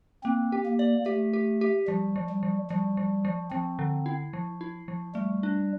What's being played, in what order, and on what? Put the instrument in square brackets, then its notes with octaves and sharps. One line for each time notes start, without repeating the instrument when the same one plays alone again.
[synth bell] A#3 [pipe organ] C4
[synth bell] G4
[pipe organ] A#3
[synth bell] D5
[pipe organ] A3 [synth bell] G4
[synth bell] G4
G4
[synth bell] F3 [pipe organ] G3
[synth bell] F3
[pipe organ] G3
[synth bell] F3
[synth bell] F3 [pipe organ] G3
[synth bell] F3
F3
[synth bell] F3 [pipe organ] C4
[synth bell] D3
E4
F3
E4
F3
[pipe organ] G3 [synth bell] A3
[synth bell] D4